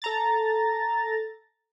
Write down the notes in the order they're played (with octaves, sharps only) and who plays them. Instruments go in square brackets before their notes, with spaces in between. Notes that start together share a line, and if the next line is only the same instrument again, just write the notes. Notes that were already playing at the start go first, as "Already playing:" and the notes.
[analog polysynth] A4 A#5 A6